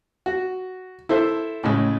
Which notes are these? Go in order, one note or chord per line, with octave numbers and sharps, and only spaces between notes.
F#4
E4 A4 C5 E5
A2 C#3 G#3